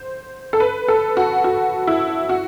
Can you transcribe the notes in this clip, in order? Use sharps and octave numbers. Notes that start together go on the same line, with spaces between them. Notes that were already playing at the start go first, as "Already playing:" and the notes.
Already playing: C5
A4
B4
A4
F#4
F#4
E4
F#4